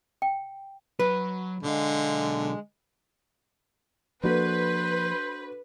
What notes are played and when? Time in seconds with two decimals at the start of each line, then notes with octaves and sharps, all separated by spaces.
0.22 G5
0.99 F#3 B4
1.63 B1 D3 G#3 F5
4.23 F3 A#3 D4 F#4 A4 B4 C5